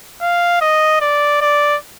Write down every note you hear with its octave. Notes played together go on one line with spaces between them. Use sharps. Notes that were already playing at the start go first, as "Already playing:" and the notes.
F5
D#5
D5
D5